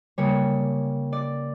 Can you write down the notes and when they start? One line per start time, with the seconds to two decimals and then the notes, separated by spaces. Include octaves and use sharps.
0.18 C#3 G3 A#3 C#5
1.13 D5